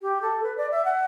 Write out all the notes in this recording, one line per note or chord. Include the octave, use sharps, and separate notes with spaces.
G4
A4
B4
D5
E5
F#5